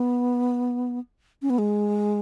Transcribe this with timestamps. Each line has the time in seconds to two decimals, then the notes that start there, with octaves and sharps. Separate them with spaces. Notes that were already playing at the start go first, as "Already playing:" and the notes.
Already playing: B3
1.42 C#4
1.50 B3
1.58 G#3